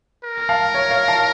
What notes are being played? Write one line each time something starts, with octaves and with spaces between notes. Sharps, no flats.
A#4
F5 A5
C#5
C#5 F5
F5 A5